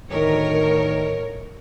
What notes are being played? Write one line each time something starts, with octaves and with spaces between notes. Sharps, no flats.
D2 A2 D#3 A#4 C#5